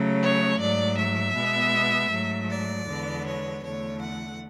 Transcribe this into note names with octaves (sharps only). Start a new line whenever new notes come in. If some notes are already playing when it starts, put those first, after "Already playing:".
Already playing: C#3 F#3 A3
C#5
G#2 F#3 A3 D5
E5
B2 G#3 B3
G#2 F#3 A3
D5
E2 D3 G#3 B3
C#5
E2 D3 A3 C#5
F#5